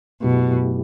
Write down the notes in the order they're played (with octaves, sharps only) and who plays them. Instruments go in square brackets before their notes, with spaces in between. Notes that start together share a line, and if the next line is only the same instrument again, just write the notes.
[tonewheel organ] F#2 F#3 A3 E4 G4 [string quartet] B2